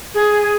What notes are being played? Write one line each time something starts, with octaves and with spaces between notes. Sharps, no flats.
G#4